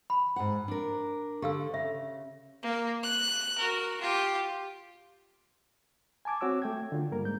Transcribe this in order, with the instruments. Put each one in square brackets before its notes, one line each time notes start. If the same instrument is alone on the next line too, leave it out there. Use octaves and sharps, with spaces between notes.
[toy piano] B5
[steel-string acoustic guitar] G#2 F#5
D4 A#4
[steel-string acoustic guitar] D3 [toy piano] G4 F5 E6
[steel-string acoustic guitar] C#3 [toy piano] E5
[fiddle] A#3
F#6
F#4 A#4
F4 G4
[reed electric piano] G#5 A5 D6 G#6
C4 F#4 C#5 D6 E6
A3 G5 G#6
D3 F4
G2 G3 A#3 A#4
G#2 G6